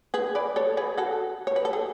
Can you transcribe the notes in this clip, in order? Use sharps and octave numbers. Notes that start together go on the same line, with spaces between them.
G#4 B4
B4 D5
A4 C#5
G#4 B4
F#4 A4
C#5
B4
A4
G#4